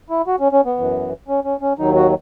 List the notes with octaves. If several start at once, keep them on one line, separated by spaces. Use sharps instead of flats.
E4
F#4
C#4
C#4
B3
F#2 E3
C#4
C#4
C#4
D#2 D#3 F#3 D#4
F#4